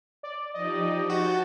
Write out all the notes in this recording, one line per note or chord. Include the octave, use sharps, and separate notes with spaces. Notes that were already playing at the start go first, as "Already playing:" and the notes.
D5
F3 D#4 G4 D5 D#5
F#4 F#5 A5 G6 A6